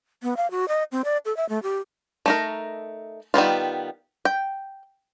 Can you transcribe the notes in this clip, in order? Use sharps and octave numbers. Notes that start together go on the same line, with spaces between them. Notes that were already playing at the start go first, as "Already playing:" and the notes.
B3
F5
F#4
D#5
C4
D5
A4
E5
A3
G4
A3 D#4 A#4
D#3 G3 B3 F4
G5